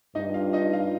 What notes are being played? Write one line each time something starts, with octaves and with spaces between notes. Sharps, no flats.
G2 D#4 D#5
F4 F5
D#4 D#5
F4 F5